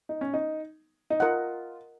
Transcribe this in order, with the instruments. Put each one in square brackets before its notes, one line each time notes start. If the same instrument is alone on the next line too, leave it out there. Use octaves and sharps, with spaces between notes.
[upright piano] D#4
C#4
D#4
D#4
[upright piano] F4 [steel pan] A#4 D#5 F#5